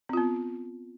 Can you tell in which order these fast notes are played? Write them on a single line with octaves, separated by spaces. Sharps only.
C4 F4 B3